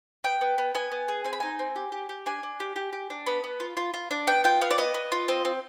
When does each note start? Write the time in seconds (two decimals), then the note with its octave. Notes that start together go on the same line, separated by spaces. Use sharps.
0.24 B3 G5
0.41 B3
0.58 B3
0.75 B3 G#5
0.92 B3
1.08 G#4
1.24 C4 G#5
1.33 B5
1.40 D#4 G#5
1.59 C4
1.76 G4
1.92 G4
2.09 G4
2.26 D4 G#5
2.43 D4
2.60 G4
2.76 G4
2.93 G4
3.10 D4
3.26 B3 B5
3.44 B3
3.60 F4
3.77 F4
3.94 F4
4.11 D4
4.27 B3 G5
4.44 F4 G5
4.61 B3 F5
4.71 D5
4.78 B3 D#5
4.94 B3
5.12 F4
5.28 C4 D#5
5.45 C4